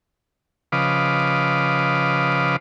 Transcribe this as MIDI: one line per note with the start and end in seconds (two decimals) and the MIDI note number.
0.72 2.56 49
0.72 2.56 53
0.72 2.56 71
0.72 2.56 75
0.72 2.56 77
0.72 2.56 86